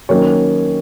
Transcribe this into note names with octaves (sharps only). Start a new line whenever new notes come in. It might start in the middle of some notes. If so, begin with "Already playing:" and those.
D#3 F#3 A#3 C#4 C#5